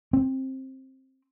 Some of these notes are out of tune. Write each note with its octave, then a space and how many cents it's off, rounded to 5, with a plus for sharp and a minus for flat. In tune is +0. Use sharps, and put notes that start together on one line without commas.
C4 +15